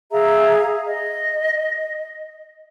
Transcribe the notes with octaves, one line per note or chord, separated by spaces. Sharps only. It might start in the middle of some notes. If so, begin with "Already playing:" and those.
G#4 E5 F5 A#5
D#5